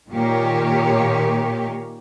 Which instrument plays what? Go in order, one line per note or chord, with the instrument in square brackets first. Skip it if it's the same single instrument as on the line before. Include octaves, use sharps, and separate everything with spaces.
[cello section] A#2 D#3 A#3 G4 C#5